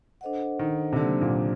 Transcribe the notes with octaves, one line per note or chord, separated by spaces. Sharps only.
D4 A4 C5 D#5 F#5
D#3
C3
D3 F#3 A#3 D4 G4 C5
A#2